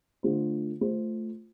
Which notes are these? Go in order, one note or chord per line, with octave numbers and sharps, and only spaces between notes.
D3 A3 F4 C5
A3 F4 C5